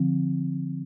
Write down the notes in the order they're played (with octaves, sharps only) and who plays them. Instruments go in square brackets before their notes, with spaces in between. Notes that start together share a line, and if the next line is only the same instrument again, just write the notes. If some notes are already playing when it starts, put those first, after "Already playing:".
Already playing: [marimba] D3 F3 C4